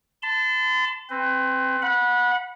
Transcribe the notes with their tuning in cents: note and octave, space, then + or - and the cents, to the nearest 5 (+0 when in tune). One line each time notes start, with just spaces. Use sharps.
A5 +0 C6 -40
C4 +10 B4 +30
F#5 -25 B5 -20